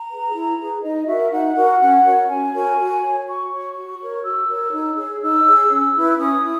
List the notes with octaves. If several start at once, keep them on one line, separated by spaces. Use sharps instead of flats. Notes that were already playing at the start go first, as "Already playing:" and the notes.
Already playing: A#5
G#4 B4
E4
G#4 B4
D#4 D#5
F#4 A#4 E5
D#4 F#5
F#4 A#4
C#4
F#4 A#4 C#5
C#4 G#5
F#4 A#4 C#5
F#4
C#5
F#4 C#6
C#5
F#4
A#4 C#5
F#4 E6
A#4 C#5
D#4
G#4 C#5
D#4 E6
G#4 C#5
C#4
E4 B4
C#4 D#6
E4